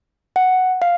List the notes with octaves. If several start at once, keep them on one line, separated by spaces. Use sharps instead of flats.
F#5
F5